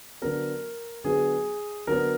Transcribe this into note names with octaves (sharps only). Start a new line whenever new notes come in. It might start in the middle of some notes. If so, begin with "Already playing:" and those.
D3 F#3 B3 A#4
D3 F#3 B3 G#4
D3 F#3 B3 A#4